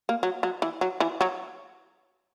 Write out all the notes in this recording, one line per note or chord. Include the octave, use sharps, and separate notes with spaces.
A#3
F#3
F#3
E3
F#3
E3
F#3